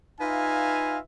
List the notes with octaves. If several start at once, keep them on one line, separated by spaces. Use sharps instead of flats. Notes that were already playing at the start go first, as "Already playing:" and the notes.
D#4 F4 B4 E5 F5 G#5